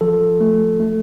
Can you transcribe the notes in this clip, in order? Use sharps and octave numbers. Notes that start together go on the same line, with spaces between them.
F3 A4
A3
A3